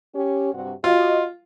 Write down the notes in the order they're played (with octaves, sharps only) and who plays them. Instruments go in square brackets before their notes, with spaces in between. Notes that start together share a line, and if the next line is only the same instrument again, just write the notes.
[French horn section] C#4 G4
G2 C3 F#4
[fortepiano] F4 [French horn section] F#4 D#5